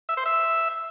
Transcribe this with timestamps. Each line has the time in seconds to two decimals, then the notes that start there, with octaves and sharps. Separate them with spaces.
0.09 E5
0.17 C5
0.26 E5